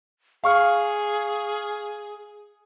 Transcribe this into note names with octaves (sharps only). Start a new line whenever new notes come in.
G#4 F5 C#6 F6